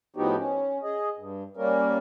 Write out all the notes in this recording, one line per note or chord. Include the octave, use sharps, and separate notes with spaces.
A2 F3 B3 D#4 F#4 G4
C#4
G#4 D#5
G2
G3 A#3 C#4 A#4